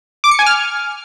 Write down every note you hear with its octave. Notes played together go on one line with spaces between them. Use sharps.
D6
C#7
G#5
F6